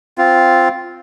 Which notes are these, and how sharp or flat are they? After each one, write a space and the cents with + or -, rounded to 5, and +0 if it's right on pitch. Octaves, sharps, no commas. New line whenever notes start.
C4 +0 F4 +0